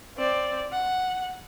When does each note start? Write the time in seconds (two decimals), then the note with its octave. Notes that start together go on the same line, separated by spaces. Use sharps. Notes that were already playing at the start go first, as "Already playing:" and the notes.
0.17 C4 D5
0.72 F#5